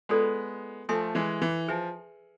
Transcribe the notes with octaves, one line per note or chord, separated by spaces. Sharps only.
G#3 B3 F4 A4 D5
F3 A3 A4 E5 G#5 C6
E3 G#3
E3
F3 G#4 B4 E5 G#5